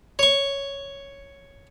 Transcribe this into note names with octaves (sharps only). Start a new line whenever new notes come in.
C#5 C#6